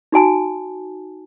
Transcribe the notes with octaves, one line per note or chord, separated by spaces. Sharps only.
D#4 F#4 G#5 A5